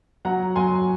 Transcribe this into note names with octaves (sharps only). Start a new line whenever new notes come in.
F#3 F#5 A#5
F#3 G#5 C6